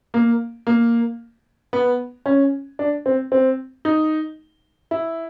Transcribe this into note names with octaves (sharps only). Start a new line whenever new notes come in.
A#3
A#3
B3
C#4
D4
C4
C4
D#4
E4